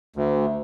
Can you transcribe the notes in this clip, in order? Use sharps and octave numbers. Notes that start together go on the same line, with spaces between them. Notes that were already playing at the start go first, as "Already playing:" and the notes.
D2